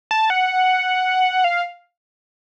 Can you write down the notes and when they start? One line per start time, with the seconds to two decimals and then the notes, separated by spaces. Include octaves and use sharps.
0.11 A5
0.30 F#5
1.44 F5